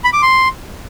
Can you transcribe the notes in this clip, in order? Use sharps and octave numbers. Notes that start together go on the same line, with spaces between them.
B5
D6
C6